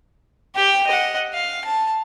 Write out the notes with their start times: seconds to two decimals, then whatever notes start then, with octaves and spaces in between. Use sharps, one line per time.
0.56 G4 G5
0.87 D#5 F#5
1.34 F5
1.65 A5